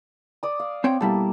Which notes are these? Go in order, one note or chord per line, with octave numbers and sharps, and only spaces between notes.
D5 D#6
F5
C4 C#5 G5
B2 G3 A#3 E4 A4